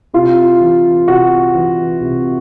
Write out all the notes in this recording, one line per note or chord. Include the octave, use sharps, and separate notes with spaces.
C3 F4
E3
C3 F#4
E3
C3